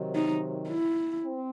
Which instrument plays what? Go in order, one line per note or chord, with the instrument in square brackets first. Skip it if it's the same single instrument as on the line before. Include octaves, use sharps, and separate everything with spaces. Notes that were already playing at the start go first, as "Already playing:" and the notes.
Already playing: [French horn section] C3 D#3 F#3
[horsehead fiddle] D#4
E4
[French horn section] C4